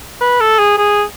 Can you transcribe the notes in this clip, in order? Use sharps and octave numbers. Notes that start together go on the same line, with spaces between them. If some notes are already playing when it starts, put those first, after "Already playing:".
B4
A4
G#4
G#4